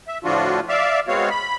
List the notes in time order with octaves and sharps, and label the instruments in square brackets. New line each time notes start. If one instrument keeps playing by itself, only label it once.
[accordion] E5
A2 D3 F3 D4 F4 F#4
D5 E5 F5
G#3 B3 C4 F#4 C#5 F5
B5